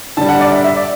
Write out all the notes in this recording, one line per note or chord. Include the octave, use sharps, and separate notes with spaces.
D3 G3 A5
F#5
D5
E5
E5
D5